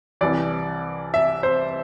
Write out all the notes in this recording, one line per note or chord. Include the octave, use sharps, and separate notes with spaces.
C2 C3 E3 D5
E5
C5